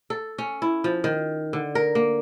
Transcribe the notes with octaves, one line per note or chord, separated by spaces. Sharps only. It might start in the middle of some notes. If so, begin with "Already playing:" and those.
A4
C#4
E4
F3
D#3
D3
A#4
A#3